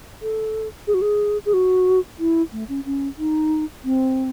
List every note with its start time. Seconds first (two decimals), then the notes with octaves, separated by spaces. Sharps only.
0.22 A4
0.87 G#4
0.94 F#4
1.02 G#4
1.45 G#4
1.54 F#4
2.19 E4
2.52 A3
2.69 C#4
2.85 C#4
3.18 D#4
3.84 C4